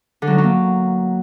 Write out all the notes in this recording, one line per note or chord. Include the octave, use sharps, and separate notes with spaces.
D3
F#3
D#4
F#3
A#3